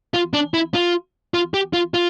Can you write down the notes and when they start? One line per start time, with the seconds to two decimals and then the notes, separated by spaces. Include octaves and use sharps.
0.14 F4
0.34 D4
0.54 E4
0.74 F4
1.34 F4
1.54 G4
1.73 F4
1.94 F4